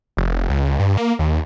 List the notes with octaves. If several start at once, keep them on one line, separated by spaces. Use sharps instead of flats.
F1
C#2
G2
A#3
D#2